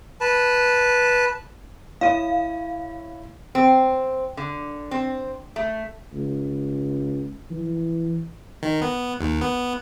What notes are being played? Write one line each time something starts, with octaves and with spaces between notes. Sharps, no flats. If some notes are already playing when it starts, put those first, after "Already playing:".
B4 A5
E4 C#5 F5 D#7
C4
D3
C4
A3
C#2
E3
D#3
B3
D#2
B3